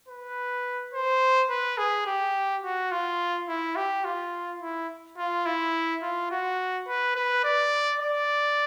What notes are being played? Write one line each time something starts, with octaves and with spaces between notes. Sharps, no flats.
B4
C5
B4
G#4
G4
F#4
F4
E4
G4
F4
E4
F4
E4
F4
F#4
B4
B4
D5
D5